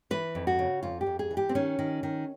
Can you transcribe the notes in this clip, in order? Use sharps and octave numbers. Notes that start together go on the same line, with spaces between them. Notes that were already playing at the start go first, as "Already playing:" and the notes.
E3 B4
F2
F#4
C#3
F2 F4
G4
F2
G#4
E3
G4
C4
D#3 C#4
D#3
D#3